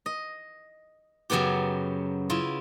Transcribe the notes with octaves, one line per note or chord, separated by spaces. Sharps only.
D#5
F#2 C#3 F#3 B3 G4
C#3 E4 F4